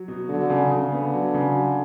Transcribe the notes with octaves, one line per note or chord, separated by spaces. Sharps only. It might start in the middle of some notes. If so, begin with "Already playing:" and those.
Already playing: F#3
B2
D3 F#3
C#3
C#3
D3 B3
F#3
C#3
F#3